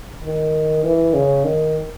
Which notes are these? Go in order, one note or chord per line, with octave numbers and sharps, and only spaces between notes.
D#3
E3
C#3
D#3